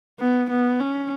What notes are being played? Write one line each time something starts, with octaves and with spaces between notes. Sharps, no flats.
B3
B3
C#4